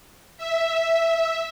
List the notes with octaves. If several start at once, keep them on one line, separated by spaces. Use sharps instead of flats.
E5